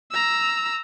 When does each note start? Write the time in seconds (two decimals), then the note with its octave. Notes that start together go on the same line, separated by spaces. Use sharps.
0.11 A#5 E6